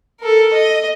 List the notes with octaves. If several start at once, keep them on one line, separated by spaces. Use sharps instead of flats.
A4 A#4
D#5